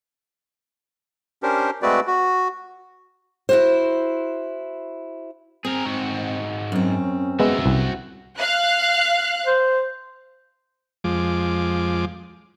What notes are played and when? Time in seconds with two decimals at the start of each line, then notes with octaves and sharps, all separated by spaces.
1.43 C#4 D4 G4 A#4 C5
1.82 G#3 A3 C4 F#4 B4 D5
2.07 F#4
3.49 E4 F#4 C5
5.65 C4 G#4 A#4
5.86 G#2 F#4
6.72 F#2 C4 C#4
7.40 G#3 B3 F#4 E5
7.66 C2
8.40 F5 F#6
9.46 C5
11.04 F2 F3 G#3 D6